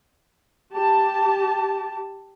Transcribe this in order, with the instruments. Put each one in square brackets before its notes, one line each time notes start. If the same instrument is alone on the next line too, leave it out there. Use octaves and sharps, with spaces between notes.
[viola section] G4 A5